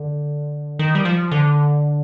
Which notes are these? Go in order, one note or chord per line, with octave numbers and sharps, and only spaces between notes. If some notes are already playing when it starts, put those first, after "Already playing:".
Already playing: D3
D#3
G3
F3
D3